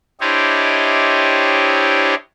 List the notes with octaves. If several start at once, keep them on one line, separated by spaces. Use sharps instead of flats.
D4 E4 G4 C5 C#5 D#5